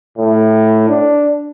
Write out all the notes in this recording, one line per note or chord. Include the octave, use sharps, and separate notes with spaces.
A2
D4